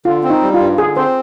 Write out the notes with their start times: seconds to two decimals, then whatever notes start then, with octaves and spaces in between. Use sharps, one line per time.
0.05 D3 F4
0.23 C4
0.30 D#4
0.42 G3
0.54 F4
0.60 G2
0.78 D3 G#4
0.97 C4 C5